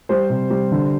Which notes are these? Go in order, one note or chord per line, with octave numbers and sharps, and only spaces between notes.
G3 C5
C3
G3
D3